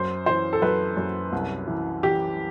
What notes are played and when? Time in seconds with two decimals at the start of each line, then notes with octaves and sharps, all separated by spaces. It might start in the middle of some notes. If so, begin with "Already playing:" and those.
Already playing: F#2 C5
0.26 E3 C5
0.53 A4
0.62 F#2 B4
0.97 F#2
1.32 C2
1.67 E3
2.03 E3 G4